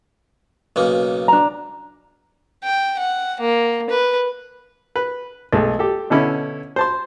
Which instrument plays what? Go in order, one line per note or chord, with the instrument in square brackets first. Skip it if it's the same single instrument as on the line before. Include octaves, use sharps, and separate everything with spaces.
[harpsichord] B1 C#3 A#3
[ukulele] D4 A#5
[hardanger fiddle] G5
F#5
A#3
B4
[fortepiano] B4
B1 G#3 A3
G4 A4
B2 D3 C#4 E4
C5 A5 C6